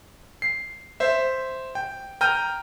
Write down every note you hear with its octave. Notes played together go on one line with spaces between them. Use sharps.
C7
C5 E5
G5
G5 A#5 F6 G6 D#7